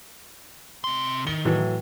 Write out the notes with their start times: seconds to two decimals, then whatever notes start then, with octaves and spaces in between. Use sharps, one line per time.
0.84 C3 C6
1.27 D#3 G7
1.45 A2 E3 F#3